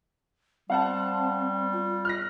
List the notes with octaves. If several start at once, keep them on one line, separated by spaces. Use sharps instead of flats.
G3 C4 F5 F#5 A5
F4
F6 F#6 A#6